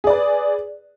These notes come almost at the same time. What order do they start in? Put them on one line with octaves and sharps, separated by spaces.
G#4 D5 B4